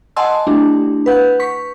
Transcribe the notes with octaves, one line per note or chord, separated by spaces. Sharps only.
D#5 F#5 G#5 A5 C6 E6
A3 D4 E4 G4
B4 F#5 G6
C#6 B6